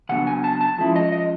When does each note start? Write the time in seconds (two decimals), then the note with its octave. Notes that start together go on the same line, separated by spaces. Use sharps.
0.09 C#3 F#3 B3 D4 F#5
0.27 G#5
0.44 A5
0.61 A5
0.78 F3 G#3 C#4 E4
0.96 D#5
1.12 D#5